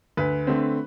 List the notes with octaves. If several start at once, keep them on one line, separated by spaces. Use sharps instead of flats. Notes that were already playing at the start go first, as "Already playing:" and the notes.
D2 B4
D3 A3 C4